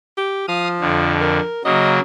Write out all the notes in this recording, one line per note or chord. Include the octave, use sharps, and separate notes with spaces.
G4
F3 F5 D#6
F2 D3
A#4
C#3 F#3 A#3 D#5